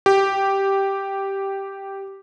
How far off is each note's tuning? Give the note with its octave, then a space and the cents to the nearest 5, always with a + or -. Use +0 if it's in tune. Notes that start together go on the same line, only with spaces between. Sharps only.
G4 -5